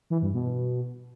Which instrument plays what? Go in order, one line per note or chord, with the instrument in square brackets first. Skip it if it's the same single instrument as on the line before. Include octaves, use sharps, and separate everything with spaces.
[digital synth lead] E3
G2
B2